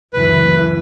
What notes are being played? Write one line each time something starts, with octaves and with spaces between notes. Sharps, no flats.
F#1 D2 E3 B4